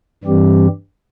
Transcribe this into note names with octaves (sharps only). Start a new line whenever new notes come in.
G2 E3 G3 C4 G4